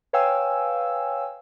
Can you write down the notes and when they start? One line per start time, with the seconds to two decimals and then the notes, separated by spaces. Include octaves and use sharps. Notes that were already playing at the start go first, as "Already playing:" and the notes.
0.13 B4 C#5 F5 G5 G#5 E6